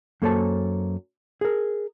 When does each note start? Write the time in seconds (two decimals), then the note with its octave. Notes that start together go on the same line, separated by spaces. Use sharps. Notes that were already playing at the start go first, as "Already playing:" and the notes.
0.22 F#2 A#3 A4 C5 C#5 A5
1.41 G#4 A#4